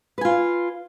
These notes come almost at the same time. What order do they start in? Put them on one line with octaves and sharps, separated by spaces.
B4 G#5 F4